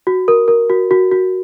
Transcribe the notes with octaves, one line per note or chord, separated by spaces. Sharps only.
F#4
A#4
A#4
F#4
F#4
F#4